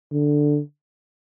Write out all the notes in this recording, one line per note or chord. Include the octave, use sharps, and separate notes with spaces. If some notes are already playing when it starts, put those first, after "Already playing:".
D3